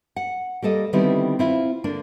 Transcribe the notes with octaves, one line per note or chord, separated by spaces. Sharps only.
F#5
G3 A#3 A4 D#5
D3 D#3 G3 B3 C4 E4
C4 E4 F4
D3 A#3 D4